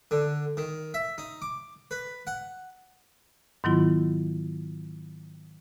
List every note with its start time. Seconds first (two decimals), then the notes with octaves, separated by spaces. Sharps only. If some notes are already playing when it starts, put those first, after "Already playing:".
0.11 D3
0.57 D#3
0.94 E5
1.18 D#4
1.42 D6
1.91 B4
2.27 F#5
3.64 G#2 D#3 F#3 B3 E4 F4